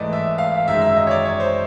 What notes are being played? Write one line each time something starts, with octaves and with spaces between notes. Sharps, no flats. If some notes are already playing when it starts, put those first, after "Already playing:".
Already playing: G#2 E3 A3 D5 D#5
E5
F5
F#2 D#3 G#3 E5
E5
D#5
C#5
D5
C#5
C5